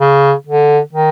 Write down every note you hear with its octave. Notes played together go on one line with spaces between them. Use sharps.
C#3
D3
D#3